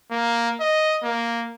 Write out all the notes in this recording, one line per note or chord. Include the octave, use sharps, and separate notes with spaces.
A#3
D#5
A#3